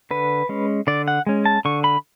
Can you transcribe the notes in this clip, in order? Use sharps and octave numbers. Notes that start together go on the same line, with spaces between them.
D3 B4
G#3 C#4
D3 D5
F#5
G#3 C#4
A5
D3 C#6
B5